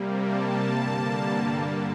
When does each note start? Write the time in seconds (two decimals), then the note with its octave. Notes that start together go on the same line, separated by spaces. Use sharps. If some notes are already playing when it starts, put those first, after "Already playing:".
Already playing: C3 G3 A#3
0.20 A5
0.75 G2 D3 G3 A#3